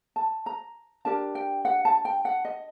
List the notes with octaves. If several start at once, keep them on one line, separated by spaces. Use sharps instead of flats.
A5
A#5
D4 G4 A#4 A5
G5
F#5
A5
G5
F#5
D#5